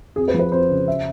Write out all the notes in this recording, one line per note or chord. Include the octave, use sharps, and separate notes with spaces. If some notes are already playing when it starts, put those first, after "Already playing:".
F2 G#4
B4
F3
B4
F2 C5
C#3
E5